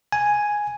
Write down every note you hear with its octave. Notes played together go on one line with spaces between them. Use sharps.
G#5